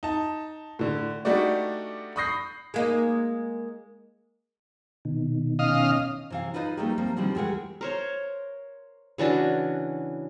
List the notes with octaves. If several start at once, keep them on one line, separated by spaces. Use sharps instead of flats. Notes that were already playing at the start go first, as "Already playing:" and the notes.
D#4 A5
A2 D3
G3 A3 D4 D#4 F#4 D5
B5 C#6 D#6 G6 A#6 C7
G#3 A#3 D#4
B2 D#3
C#4 D#5 F5
C3 E3 F5
D#4 F4 B4 C5 D5 D#5
G3 A3 A#3 D#4 G4 G#4
F3 G3 A#3 C4
B2 D3 D#3 F3 G3 C4
D2 E3 G#3 G4 A#4 F#5
A#4 C5 C#5
C#3 E3 D4 F#4